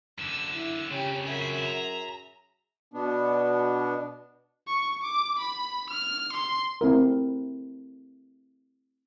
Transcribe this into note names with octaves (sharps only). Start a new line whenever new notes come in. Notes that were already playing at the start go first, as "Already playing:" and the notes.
F#2 D3 E6
E4
F2 C#3 C#4 G4
F#2 G#4 E5
A#5
B2 B3 D4
C#6
D6
B5
F6
C6
A3 C4 E4 A#4